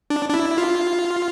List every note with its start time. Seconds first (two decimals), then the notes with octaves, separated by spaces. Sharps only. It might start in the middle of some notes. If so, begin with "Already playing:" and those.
0.10 D4
0.29 D4
0.34 E4
0.58 F4